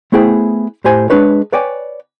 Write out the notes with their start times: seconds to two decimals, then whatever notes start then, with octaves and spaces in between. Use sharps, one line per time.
0.12 A3 B3 E4 G#4 C5 G5
0.84 A2 G4 C5 G#5
1.10 G#3 A#3 D4 G#4 B4 C#5
1.52 B4 C#5 D5 G5 G#5